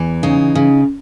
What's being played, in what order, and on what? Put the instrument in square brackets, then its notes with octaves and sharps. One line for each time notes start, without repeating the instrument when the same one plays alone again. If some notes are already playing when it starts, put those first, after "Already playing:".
Already playing: [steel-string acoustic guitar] E2 E3
C#3 D#4
C#3